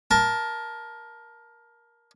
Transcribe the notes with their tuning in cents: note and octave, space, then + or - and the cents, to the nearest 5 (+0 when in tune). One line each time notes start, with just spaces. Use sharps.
A#4 +15 A5 +0